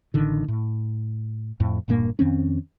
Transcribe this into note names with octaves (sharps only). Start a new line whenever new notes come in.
A1 D3 D#3
A2
F2 A2
E1 G2 A#2 A#3
F2 D#3 C4 C#4